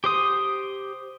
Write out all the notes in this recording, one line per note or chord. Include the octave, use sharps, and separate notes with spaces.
G4 C5 D#6